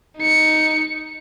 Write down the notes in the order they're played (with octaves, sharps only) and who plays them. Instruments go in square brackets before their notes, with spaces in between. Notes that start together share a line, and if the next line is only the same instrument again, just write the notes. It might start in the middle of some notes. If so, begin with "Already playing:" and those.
[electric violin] D#4 C#7